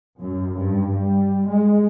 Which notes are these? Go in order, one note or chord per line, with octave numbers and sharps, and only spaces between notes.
F#2
G2
G3
G#3